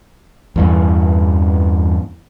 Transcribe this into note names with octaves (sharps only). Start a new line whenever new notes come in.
E2 G2 E3